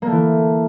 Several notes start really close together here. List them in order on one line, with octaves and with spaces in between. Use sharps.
A#3 A3 E3